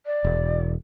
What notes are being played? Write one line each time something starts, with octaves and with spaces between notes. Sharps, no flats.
D5
E1